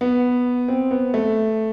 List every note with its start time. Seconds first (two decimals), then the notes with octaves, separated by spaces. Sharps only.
0.01 B3
0.68 C4
0.91 B3
1.14 A3